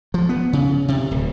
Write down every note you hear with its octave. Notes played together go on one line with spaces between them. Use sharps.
F3
B3
C#3
C3
D1